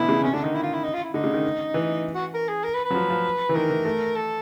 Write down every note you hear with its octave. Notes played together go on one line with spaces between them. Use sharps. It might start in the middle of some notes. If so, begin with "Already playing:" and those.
Already playing: B2 D3 E3 E4
C#3
C3 C#4
D3 D4
D#3 D#4
E4
F4
E4
D#4
F4
E4
D3 D#4
C#3
D#3
E3
F#4
A#4
G#4
A#4
B4
B4
F#3
F3
F3
E3
D#3 A#4
E3
A3
A4